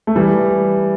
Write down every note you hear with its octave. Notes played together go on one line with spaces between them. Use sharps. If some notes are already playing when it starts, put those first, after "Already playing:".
A3
E3 G3